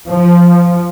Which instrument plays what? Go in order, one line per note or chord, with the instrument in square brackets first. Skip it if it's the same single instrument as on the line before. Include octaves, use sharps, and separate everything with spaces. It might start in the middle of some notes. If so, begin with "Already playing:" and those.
[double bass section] F3